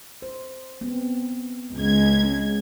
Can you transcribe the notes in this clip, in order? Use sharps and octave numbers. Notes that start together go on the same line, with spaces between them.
C5
B3 C4
C#2 G#6
G#3 C#4